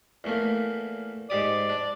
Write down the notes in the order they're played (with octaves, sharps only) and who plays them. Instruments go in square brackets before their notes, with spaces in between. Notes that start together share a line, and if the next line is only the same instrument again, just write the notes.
[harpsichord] E2 A3 A#3
[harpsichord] G#2 G4 D#6 [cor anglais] D5
[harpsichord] D4